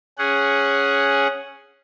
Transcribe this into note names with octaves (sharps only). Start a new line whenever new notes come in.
C#4 G#4 F#5